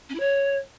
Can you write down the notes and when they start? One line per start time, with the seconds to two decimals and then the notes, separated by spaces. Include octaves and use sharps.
0.09 C#4
0.14 E4
0.19 C#5